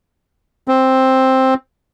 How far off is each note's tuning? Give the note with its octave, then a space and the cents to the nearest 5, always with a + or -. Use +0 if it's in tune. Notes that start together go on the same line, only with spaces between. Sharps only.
C4 +5